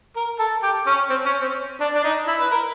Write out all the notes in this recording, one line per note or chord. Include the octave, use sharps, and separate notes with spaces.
A#4
A4
G4
C#4
C4
C#4
C4
D4
D4
D#4
E4
B4
A#4